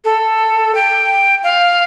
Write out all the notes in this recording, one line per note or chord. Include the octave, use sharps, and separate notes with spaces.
A4
G5
F5